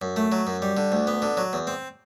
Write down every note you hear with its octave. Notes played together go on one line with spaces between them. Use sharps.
F#2
A3
F#3
F#2
G3
D3
D2
B3
D3
F#3
E2
C4